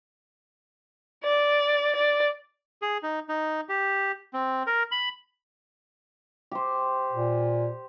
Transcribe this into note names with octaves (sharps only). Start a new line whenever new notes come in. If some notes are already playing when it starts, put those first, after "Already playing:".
D5
D5
G#4
D#4
D#4
G4
C4
A#4
B5
G4 C5
A#2